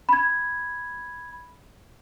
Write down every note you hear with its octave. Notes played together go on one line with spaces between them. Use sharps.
B5 G#6